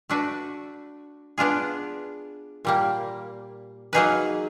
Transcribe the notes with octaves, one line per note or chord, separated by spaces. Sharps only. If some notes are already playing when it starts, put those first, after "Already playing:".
A3 D4 F#4 B4 D5
B3 D4 F4 G#4
A#2 G3 A#3
F#3 A#3 D#4 G#4 B4